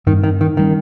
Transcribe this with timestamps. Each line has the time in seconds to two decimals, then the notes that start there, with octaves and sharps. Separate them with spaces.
0.07 G2 D#3 G3 C4
0.23 D#3
0.41 D#3
0.57 D#3 G3 C#4